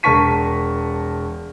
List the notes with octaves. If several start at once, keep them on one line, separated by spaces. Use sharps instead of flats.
E1 A#4 A5 C#6 B6 D#7